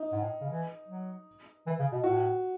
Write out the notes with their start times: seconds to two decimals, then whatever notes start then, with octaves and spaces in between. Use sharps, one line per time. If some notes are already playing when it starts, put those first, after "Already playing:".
Already playing: D#4
0.12 G#2
0.21 A2
0.41 C#3
0.50 E3
0.88 F#3
1.66 E3
1.79 C#3
1.92 B2
2.04 A2 F#4